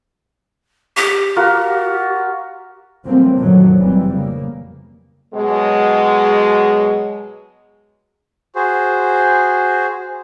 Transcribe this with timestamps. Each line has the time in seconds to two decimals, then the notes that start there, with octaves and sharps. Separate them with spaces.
0.97 G4
1.36 F4 F#4 A#4
3.05 E3 F#3 G3 A3 A#3 C4
3.38 F#2 A#2 D3 D#3 F3 F#3
3.78 F1 E3 G3 C4
4.13 C#3 A#3
5.34 B2 F#3 G#3
8.56 F#4 G#4 C5